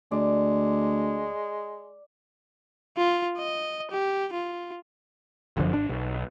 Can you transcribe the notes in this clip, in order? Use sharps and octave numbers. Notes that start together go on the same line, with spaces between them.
D2 G#3 D5
F4
D#5
G4
F4
G1 F#2 D3 F3
G#1 D4
B1